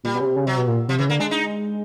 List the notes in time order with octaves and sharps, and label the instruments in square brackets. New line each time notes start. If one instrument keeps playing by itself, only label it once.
[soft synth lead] A#2 [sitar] G3
[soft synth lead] B2
C#3
C3
C#3
[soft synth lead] C3 [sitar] F#3
[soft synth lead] B2
A#2
[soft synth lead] C3 [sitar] F3
[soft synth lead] C#3 [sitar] E3
[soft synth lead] D3 [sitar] A#3
[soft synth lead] G#3 [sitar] D4
[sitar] D#4